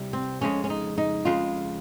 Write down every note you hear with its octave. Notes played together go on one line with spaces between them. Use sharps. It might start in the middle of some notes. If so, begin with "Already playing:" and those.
Already playing: C2 C3 G3
C4
F2 C#3 G#3 C#4
C#4
D#4
D#4
F2 C#3 G#3 F4